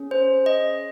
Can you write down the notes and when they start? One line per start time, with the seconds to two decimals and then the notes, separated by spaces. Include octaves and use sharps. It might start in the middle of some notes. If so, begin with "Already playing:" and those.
Already playing: C#4 G#4
0.11 C5
0.46 D#5